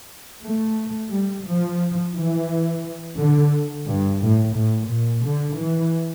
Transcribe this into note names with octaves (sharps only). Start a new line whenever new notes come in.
A3
G3
F3
E3
D3
G2
A2
A2
A#2
D3
E3